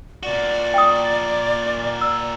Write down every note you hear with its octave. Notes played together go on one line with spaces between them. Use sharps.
A#2 F#4 D5
G5 D#6
E6